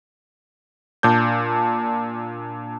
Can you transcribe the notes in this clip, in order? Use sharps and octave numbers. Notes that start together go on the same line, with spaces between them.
A#2 D4 G6